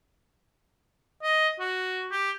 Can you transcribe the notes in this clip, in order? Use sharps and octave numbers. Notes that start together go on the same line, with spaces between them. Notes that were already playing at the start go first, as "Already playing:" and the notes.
D#5
F#4
G4